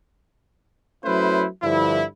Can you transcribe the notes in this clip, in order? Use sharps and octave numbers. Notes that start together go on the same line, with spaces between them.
F#3 A3 C#4 E4 B4 C5
G2 D3 F3 E4